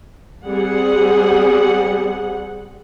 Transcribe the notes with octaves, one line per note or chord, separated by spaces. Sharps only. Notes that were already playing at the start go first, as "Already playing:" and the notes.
G3 C4 G#4 F#5